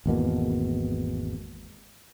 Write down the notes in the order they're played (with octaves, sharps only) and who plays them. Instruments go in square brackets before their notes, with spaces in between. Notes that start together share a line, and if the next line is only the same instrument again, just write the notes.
[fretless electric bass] G#1 E2 B2 A#3